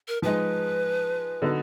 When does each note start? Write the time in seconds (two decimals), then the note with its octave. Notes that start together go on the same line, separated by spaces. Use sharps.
0.08 A#4
0.22 F3 G#3 D#4 B4
1.42 D3 F#3 B3 D#4